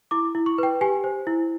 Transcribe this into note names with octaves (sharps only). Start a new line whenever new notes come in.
E4 D6
E4
C#6
B4 G5
G4 G#5
C5
E4